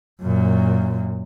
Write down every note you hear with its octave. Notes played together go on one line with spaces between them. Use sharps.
F#2 A#2